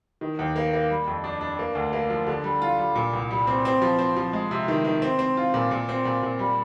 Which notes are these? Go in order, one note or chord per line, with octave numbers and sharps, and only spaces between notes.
D#3
D#2
A#3
A#3
G3
F2
D4
D4
A#3
D2
A#3
F3
D3
G3
F4
G3
A#2
C2
G3
C4
C4
F3
C4
F3
G#3
C3
D#3
D#3
C4
C4
F4
A#2
A#2
C4
A#2
A#2
G3